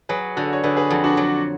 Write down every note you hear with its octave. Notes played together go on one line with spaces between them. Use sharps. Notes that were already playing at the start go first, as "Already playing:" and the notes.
F#3 G#4 B4
D3 F#4 A4
C#5
D3 G#4 B4
G#4 B4
F2 F#4 A4
D4 F#4
F#3